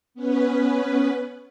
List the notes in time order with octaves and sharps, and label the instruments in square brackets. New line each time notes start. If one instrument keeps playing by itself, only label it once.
[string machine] B3 C#4 B4